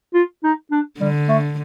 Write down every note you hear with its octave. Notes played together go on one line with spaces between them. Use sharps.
F4
D#4
D4
D3 G3
A3